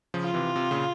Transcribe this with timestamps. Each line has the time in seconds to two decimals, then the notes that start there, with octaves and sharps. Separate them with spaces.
0.14 C#3 F3
0.24 F4
0.34 C3 E3
0.56 C3
0.71 A#2 C#3